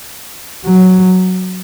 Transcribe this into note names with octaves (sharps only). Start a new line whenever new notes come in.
F#3